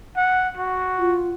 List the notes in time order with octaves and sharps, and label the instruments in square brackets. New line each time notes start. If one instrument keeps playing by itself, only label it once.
[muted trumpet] F#5
F#4
[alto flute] F4